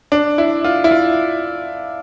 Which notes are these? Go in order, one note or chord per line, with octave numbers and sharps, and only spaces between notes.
D4
E4
F4
E4
F4